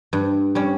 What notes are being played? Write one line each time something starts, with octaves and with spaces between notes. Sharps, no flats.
G2
G3 C#4